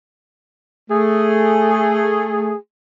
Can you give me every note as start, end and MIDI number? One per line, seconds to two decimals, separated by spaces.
0.91 2.53 57
0.91 2.53 68